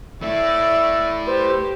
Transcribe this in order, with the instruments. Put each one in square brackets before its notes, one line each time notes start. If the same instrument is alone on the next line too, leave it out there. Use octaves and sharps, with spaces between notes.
[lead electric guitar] A3 E4 [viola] D5 [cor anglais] E5
[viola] G4 [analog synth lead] B4 [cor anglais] C5